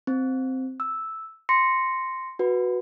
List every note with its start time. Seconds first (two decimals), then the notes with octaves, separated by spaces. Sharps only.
0.07 C4
0.80 E6
1.49 C6 A#6 C#7
2.39 F#4 B4